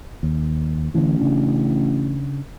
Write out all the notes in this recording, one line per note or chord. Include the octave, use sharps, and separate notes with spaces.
D#2
A1 D3 E3
C#3 D4